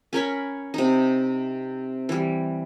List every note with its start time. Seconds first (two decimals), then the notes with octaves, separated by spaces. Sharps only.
0.13 C#4 A#4 C#5 B5
0.74 C3 D#4
2.09 E3 G3